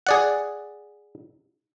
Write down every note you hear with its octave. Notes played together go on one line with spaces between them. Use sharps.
G#4 D5 F#5